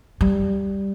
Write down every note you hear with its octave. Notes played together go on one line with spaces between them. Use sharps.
G3